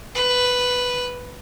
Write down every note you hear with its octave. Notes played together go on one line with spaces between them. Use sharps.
B4